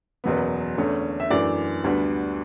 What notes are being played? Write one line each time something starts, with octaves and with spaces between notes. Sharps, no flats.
F#1 E2 B2 F#3 B3
E2 D3 A3 C#4
E5
F#2 E3 A3 D4 D5
D2 D3 G3 B3 D4